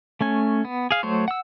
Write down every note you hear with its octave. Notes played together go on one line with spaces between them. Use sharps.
A3 C#4 G#5
B3
G#4 F5
F#3 A3 C5 C#5
F#5 E6